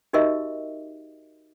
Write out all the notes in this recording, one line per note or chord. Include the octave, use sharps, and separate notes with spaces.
D#4 F#4 G4 A#4 D#5 E5